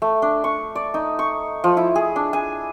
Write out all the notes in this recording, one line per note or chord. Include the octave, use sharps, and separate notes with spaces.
A3
D4
C#6
D5
D#4
C#6
F3
E4
G#4
D4
G#5